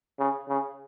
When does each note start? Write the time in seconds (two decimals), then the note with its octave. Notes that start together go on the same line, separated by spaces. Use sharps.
0.19 C#3
0.49 C#3